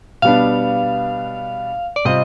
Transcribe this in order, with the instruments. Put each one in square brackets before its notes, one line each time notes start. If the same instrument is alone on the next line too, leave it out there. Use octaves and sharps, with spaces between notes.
[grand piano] B2 G3 B3 D4 [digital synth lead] F5
[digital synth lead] D5
[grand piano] C3 G3 C4 F4 [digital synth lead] D#5